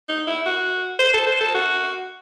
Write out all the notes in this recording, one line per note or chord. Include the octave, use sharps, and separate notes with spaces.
D#4
E4
F#4
C5
A4
C5
A4
F#4